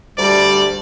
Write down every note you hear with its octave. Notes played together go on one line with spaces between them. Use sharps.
D2 G3 D5